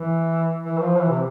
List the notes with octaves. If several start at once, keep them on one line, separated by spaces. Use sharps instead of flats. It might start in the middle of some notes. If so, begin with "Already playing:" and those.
Already playing: E3
E3
F3
E3
C3